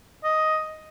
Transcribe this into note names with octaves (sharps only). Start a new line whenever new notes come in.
D#5